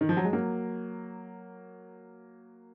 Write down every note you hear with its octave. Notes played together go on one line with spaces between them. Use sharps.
D#3
F3
F#3
G#3
F#3 A#3